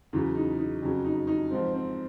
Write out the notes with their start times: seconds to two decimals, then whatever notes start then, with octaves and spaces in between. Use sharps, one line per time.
0.13 E2 C#3 F#3
0.35 D#4
0.59 D#4
0.81 F2 C#3 F#3
1.04 D#4
1.27 D#4
1.50 G#2 F3 C4
1.74 C4